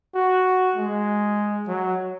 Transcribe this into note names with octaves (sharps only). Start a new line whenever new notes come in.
F#4
G#3
F#3